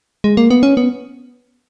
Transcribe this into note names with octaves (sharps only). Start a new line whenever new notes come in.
G#3
A#3
B3
C#4
B3